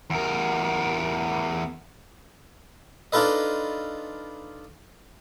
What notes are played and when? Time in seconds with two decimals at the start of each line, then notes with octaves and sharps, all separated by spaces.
0.10 E2 A#4
3.12 D4 D#4 F4 A4 B4 D#5